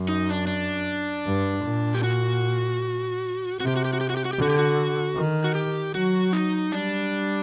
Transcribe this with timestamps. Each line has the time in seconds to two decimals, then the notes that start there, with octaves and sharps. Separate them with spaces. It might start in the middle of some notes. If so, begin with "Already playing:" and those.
Already playing: F#2
0.09 D#4
0.29 D4
0.47 D4
1.27 G2
1.65 A#2
1.94 G4
2.03 F#4
3.60 C3 F#4
3.68 G4
3.76 F#4
3.85 G4
3.93 F#4
4.01 G4
4.10 F#4
4.17 G4
4.25 F#4
4.33 G4
4.38 D3 F#4
4.50 G4
4.59 F#4
5.16 D#3
5.44 F#4
5.55 G4
5.94 F#3 F#4
6.33 D#4
6.72 G3 D4